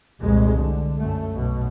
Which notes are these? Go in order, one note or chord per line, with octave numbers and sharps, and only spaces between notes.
F1 C2 F2 A#2 G#3
D3
F#2 A3
B1 B2